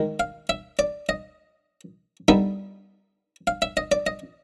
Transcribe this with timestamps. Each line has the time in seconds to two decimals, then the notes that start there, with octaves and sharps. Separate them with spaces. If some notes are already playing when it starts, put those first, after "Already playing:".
Already playing: D#3 G#3
0.20 F5
0.49 E5
0.79 D5
1.09 D#5
2.28 D3 G3 B3 D#4 E5
3.47 F5
3.62 E5
3.77 D#5
3.92 D5
4.07 D#5